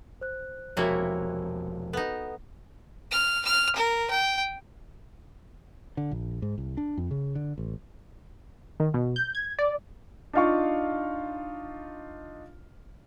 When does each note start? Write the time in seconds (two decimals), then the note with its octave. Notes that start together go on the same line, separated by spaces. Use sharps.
0.21 C5 F#6
0.77 E1 C3 F3 A#3 E4 F#4 G#4 C#5
1.93 B3 D#4 A4 B4 F#5
3.11 F6
3.45 F6
3.76 A#4
4.10 G5
5.97 D3
6.11 A#1
6.42 G#2
6.58 C2
6.77 D4
6.97 F2
7.11 C#3
7.35 D3
7.58 A1
8.80 D#3
8.94 B2
9.16 G6
9.35 G#6
9.59 D5
10.33 D4 D#4 F4 F5 C#6